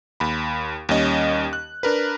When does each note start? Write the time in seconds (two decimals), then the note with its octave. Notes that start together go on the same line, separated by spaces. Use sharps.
0.20 D#2 B5
0.89 D#2 G3 C#4 D#5
1.53 F#6
1.83 D4 A#4 B4